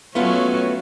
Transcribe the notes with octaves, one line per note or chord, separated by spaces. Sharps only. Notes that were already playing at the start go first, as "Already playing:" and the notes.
F#3 A3 B3 C#4 F4